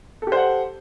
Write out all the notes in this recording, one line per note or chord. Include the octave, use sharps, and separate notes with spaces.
G4 A4 C5 F#5